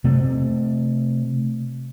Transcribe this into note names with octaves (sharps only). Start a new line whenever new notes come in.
C3 A3 C4